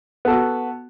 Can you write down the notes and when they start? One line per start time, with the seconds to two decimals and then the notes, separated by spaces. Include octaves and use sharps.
0.25 B3
0.27 A4
0.30 F#4